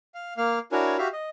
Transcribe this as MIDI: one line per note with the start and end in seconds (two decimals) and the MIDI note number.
0.14 0.34 77
0.37 0.59 58
0.37 0.59 77
0.72 0.97 62
0.72 0.97 64
0.72 0.97 66
0.72 0.97 70
0.72 0.97 73
0.72 0.97 80
0.98 1.08 66
0.98 1.08 67
0.98 1.08 76
0.98 1.08 77
1.13 1.30 75